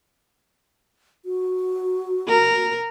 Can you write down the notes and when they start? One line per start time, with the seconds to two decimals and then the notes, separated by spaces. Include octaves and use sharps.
1.25 F#4
2.28 A#4